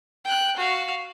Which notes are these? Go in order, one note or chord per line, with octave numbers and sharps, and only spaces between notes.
G5 F#6
F#4 F5